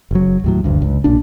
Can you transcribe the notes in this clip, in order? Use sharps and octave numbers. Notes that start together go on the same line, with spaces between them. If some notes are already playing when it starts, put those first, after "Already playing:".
F#1 F#3
D#2 A2 F#3
F#1 D2 G2
C#2
B1 A#2 D4